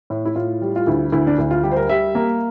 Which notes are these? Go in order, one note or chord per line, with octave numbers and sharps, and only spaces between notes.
A2
E4
A2 F4
G3
F4
D2 E4
D2 E4
D4
D2 E4
F4
G3 G4
C5
A#4
G3 E5
A#3